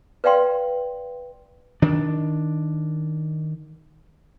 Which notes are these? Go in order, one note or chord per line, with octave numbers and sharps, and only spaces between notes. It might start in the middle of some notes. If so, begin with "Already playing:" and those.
B4 D5 F5 G5 C6
D#3 D4